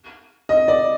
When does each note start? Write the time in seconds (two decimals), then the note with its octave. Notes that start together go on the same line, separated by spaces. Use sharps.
0.49 D#5
0.68 D5